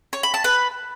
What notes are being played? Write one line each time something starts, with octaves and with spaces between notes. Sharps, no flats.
C#5
B5
A5
B4